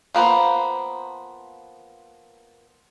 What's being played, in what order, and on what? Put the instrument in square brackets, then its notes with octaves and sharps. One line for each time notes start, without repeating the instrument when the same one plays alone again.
[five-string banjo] F3 A#3 B3 C5